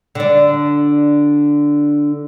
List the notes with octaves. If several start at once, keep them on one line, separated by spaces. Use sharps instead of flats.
D3 D4